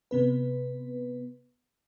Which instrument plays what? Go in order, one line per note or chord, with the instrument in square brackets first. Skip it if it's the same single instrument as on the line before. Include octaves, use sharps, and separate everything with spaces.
[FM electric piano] C3 B3 B4